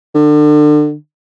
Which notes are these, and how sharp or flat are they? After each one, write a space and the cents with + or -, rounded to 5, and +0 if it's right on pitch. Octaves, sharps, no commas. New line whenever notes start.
D3 +30